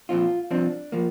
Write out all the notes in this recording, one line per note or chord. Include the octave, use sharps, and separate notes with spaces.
A#2 F3 C4 F4
C2 C3 F3 C4 D4
F3 A#3